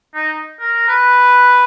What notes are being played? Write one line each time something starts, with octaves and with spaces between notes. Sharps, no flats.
D#4
A#4
B4